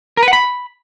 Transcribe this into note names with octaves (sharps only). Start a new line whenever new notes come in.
A#4
B4
F#5
B5